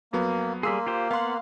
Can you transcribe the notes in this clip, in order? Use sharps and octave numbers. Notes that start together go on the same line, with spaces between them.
F2 F#3 A#3 B3
G3 A#3 G#4 C6 E6 B6
F4 G4 C5
B3 F5 F#5 C6